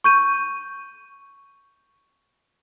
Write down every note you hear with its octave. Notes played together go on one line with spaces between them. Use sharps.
C#6 G6 D#7